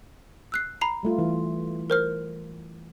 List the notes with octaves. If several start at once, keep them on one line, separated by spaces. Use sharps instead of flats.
E6 F#6 C7
A#5 B5 C7
G3 A3 F4
E3
A#4 C5 F6